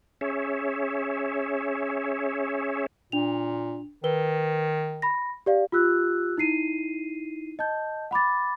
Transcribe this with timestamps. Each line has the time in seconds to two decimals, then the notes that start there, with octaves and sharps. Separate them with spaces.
0.21 C#4 G#4 C#5 E5
3.12 A#2 D4 F7
4.04 D#3 B4 G7
5.02 B5 A#6
5.46 G4 D5 F5
5.72 F4 G4 E6 F#6
6.37 D#4 E4 C7 D#7
7.59 D#5 A5 G6
8.11 F#5 B5 D6 A6